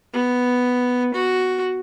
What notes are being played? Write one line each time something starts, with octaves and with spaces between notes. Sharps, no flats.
B3
F#4